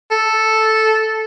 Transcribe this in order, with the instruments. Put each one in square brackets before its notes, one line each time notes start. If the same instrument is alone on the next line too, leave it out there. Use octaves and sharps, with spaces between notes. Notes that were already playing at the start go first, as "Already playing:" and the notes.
[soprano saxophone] A4